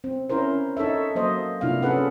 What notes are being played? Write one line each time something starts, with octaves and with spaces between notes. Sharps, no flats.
C4
C#4 E4 A#4 C5
D#4 A4 C#5 E5
F#3 A#3 C5 D#5
C3 A#3 D4 E4 F4 F5
C#4 G#4 A4 B4 F#5